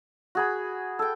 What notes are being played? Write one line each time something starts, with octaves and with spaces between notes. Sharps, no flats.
F#4 G#4 B5
A4 G5